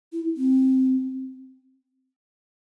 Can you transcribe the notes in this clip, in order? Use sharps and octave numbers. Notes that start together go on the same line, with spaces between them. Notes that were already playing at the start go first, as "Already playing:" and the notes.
E4
C4